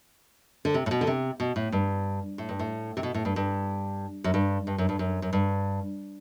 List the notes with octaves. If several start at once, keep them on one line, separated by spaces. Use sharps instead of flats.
D3
C3
A2
B2
D3
C3
B2
A2
G2
A2
G2
A2
C3
B2
A2
G2
G2
F#2
G2
G2
F#2
G2
F#2
F#2
G2